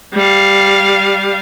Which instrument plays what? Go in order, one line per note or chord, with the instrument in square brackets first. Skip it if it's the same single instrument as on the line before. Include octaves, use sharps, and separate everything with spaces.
[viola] G3 F5